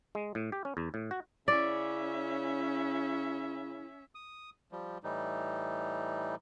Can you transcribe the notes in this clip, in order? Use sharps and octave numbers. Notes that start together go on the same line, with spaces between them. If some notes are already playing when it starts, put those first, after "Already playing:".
G#3
A2
G4
C#4
E2
A2
F#4
C#3 C#4 E4 D5 E5
D#6
F3 G3
A2 E3 G3 D#4